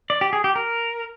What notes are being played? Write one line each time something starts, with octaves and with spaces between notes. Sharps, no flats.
D5
G4
G#4
G4
A#4